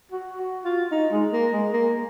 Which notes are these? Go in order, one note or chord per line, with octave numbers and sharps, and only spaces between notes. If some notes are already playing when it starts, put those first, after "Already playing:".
F#4
F#4
F4
D#4
G#3
A#3
G#3
A#3